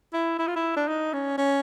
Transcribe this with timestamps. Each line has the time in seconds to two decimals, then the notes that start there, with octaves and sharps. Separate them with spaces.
0.13 E4
0.39 E4
0.48 F4
0.56 E4
0.76 D4
0.88 D#4
1.13 C#4
1.38 C#4